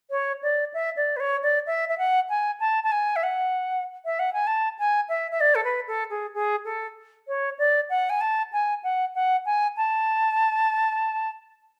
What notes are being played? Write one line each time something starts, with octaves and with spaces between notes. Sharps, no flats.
C#5
D5
E5
D5
B4
C#5
D5
E5
E5
F#5
G#5
A5
A5
G#5
E5
F#5
E5
F#5
G#5
A5
G#5
E5
E5
D5
A4
B4
A4
G#4
G#4
A4
C#5
D5
F#5
G#5
A5
G#5
F#5
F#5
G#5
A5